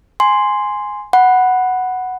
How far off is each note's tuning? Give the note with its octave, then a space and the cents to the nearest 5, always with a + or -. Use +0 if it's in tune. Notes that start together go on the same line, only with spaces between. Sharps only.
G#5 +0 C6 +0
F#5 +0 B5 +0